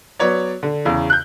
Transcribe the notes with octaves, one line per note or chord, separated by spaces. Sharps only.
F#3 B3 C#5 D5
D3
E2 C#3
F#6 G6